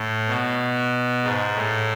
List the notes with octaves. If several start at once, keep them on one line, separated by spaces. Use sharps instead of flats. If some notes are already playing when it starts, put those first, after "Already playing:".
Already playing: A2
B2
G#2
A2